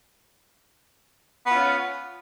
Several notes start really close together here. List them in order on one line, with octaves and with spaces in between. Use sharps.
B3 F4 C#4